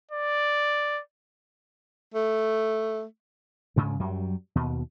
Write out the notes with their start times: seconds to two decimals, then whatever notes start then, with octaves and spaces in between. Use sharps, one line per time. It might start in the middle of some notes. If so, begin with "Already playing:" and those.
0.11 D5
2.15 A3
3.76 D2 G#2 C#3
4.00 F#2 F#3 G3
4.55 D#2 B2